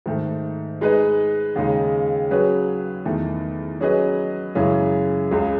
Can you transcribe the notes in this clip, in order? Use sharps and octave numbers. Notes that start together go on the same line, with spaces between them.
G#2 D#3 A3
G#3 D#4 G#4 B4 D#5
D#2 C#3 G#3 D#4
F#3 C#4 G#4 B4
E2 D#3 A3
F#3 C#4 G#4 B4 D#5
F#2 C#3 E3 G#3 C#4
C#2 C#3 G#3